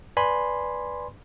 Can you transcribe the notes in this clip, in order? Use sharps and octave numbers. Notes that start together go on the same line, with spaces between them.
B4 D5 G#5 B5 C6